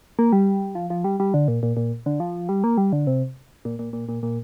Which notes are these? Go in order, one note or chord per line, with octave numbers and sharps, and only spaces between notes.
A#3
G3
F3
F3
G3
G3
D3
A#2
A#2
A#2
D3
F3
G3
A#3
G3
D3
C3
A#2
A#2
A#2
A#2
A#2